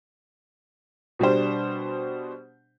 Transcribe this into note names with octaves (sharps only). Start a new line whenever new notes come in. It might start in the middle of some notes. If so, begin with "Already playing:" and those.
B2 G3 D4 C5